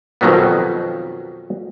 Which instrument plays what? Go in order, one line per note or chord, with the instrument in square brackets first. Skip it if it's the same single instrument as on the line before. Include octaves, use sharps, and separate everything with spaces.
[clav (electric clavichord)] F2 B2 D#3 F#3 G3 B3